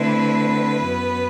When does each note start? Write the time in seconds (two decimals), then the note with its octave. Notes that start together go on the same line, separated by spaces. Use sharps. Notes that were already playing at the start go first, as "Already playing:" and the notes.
Already playing: D3 A3 C4 E4 B4
0.87 F#2 F#3 B3